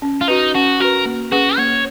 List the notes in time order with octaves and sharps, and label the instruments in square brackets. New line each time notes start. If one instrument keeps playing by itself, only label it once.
[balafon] C#4
[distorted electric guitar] F4
[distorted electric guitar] D#4 [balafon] F#4 B4
[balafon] C#4 [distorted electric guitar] F#4
[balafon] F#4 B4 [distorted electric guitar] A#4
[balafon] A#3
[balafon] C#4 G#4 B4 [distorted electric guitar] F#4
[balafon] A#3 [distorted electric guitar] C#5